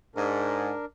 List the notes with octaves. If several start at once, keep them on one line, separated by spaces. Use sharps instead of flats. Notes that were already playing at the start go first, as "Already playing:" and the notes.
G#2 D4 A#4